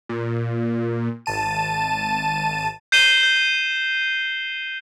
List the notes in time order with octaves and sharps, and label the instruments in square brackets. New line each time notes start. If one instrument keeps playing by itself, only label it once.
[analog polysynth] A#2
G#1 A5 D#7
[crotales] G6 C7 D#7 E7 G7
G6